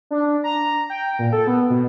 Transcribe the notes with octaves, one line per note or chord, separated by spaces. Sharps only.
D4
A#5
G5
A#2
A4
B3
B2